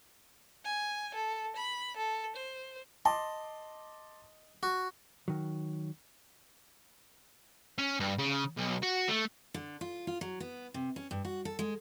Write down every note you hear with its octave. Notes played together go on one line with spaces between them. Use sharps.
G#5
A4
B5
A4
C5
D#5 A5 C6 D6
F#4
D#3 F#3
C#4
G2
C#3
B1
F#4
A3
D3
F4
F4
F#3
B3
C3
C#4
G2
F#4
A4
G#3